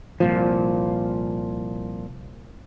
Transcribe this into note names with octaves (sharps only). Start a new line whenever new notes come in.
C2 A#2 F3